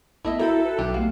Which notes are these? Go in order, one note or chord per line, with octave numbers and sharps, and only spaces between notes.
A1 A3 B3 E4 D#5 E5
F#4 A4 A#4 E5 G5 B5
B4
B1 D4 G4
A3 B3 F#4 G4 F5